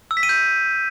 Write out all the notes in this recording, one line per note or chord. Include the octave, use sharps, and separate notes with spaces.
E6
B6
D#7
G6